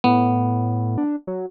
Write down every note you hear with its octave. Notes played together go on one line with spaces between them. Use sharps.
A2 B3
D4
F#3